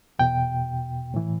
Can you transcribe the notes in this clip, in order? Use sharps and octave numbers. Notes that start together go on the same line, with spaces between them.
E2 B2 G5
A2 E3